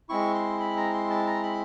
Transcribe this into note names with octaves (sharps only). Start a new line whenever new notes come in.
G#3 C4 E4 C#6
C6
B5
A#5
C6
A5
A#5
B5